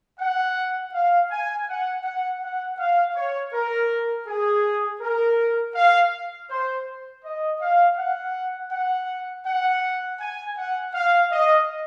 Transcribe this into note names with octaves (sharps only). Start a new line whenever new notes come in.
F#5
F5
G#5
F#5
F#5
F#5
F5
C#5
A#4
G#4
A#4
F5
C5
D#5
F5
F#5
F#5
F#5
G#5
F#5
F5
D#5